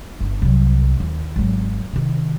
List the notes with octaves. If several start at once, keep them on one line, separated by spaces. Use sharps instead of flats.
G1
C2 F#3
D#2
G#1 F#3
C3 D#3